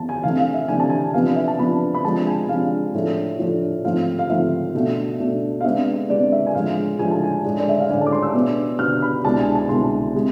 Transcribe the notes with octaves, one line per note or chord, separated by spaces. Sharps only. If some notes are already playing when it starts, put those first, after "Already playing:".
Already playing: E2 A5
G#5
C3 E3 A3 D4 F5
F5
E5
C3 E3 A3 D4 G#5
A5
G#5
C3 F3 B3 D4 F5
E5
A5
C3 F3 B3 D4 B5
B5
C3 F3 G#3 D4 A5
G#5
C3 F3 G#3 D4 F5
A2 F3 A3 D4
A2 F3 A3 D4
G#2 F3 A3 C4 F5
F5
G#2 F3 A3 C4 E5
B2 A3 D4
B2 A3 D4
F5
C3 G#3 B3 D4 E5
C3 G#3 B3 D4 D5
E5
G#5
A2 F3 G#3 D4 F5
A2 F3 G#3 D4 G#5
A5
G#5
A2 G#3 D4
D5
E5
F5
A2 G#3 D4 G#5
A5
D6
C6
E6
B2 B3 D4
B2 B3 D4 F6
B5
C2 B2 G#3 D4 A5
G#5
A5
C2 B2 G#3 D4 C6
C3 G#3